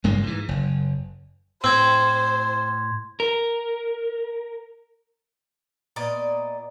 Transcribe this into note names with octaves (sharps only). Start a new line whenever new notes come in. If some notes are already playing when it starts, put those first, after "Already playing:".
F#1 G2 G#3 A#3
G#2 E3
F#1
A2 C4 C5 C6 G#6
A#4
A#2 B3 D5 D#5